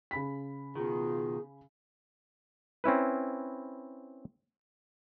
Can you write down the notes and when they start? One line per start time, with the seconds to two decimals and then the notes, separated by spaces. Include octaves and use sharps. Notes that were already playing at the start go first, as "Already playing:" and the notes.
0.11 C#3 B5 B6
0.75 B2 D#3 F4 G#4
2.84 C4 C#4 E4 B4